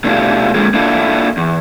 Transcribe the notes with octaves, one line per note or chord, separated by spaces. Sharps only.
B2 A3 D4 E4 F4 G4
D3 G#3 A#3 C4 F4 G#4
A#3 D4 E4 F4 A4
E2